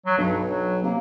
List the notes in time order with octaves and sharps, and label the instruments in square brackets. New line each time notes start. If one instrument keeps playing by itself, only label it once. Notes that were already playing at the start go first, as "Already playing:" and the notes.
[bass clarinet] F#3
[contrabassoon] B1 [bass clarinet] G2
[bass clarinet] F#3
[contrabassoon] C3 [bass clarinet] A#3